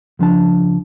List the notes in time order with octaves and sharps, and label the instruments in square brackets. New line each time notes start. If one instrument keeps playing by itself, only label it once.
[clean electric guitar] C#2 F3 D4 A5